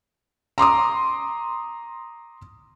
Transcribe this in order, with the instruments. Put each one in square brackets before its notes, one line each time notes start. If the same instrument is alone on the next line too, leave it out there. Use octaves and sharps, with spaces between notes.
[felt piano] A#5 C6 D6 D#6